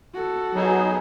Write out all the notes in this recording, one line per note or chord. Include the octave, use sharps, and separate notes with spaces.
F#4 A4
F#3 B3 D#4 G#4